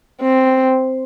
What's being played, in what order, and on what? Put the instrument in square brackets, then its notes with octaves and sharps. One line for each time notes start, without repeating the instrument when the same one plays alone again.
[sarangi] C4